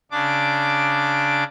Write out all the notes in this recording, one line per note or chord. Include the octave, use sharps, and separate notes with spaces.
C#3 D4 D6